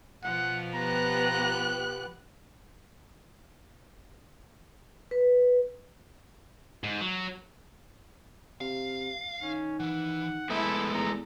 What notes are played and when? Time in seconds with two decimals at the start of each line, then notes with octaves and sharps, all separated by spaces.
0.23 B2 F3 F4 F#5
0.74 B3 G4 A#5 F#6
5.11 B4
6.84 G#2
7.01 F#3
8.61 C3 F5
9.42 D#3 C#4
9.80 E3 F#5
10.50 G#3 A3 B3 E4 A4
10.94 E2 A#5